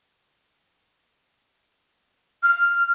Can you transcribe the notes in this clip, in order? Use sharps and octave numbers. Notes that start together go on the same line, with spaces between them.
F6